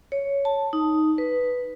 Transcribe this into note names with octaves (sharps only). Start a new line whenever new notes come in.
C#5
A5
D#4
B4